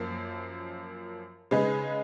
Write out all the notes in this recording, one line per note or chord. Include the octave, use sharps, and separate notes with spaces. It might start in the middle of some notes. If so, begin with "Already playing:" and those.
Already playing: F#2 F3 A#3
C#3 G#3 D#4 G#4 B4